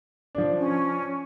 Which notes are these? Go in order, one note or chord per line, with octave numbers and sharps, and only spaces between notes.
F3 D4
C#4